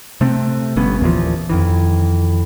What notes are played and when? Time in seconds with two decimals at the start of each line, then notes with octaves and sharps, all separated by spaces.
0.21 C3 A3 C4
0.76 G1 G2 B3 C#4
1.01 D#2 A#2 E3 F3
1.50 F2 D#3 E3